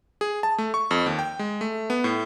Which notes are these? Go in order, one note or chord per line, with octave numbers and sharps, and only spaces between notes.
G#4
A5
A3
C#6
F2
D#2
G5
G#3
A3
B3
A2